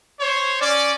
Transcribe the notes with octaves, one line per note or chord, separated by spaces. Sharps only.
C5 C#5
C#4 D5